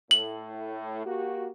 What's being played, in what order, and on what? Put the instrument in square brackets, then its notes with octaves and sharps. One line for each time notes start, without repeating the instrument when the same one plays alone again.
[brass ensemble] A2 [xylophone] F#7
[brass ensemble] A#3 F#4 G4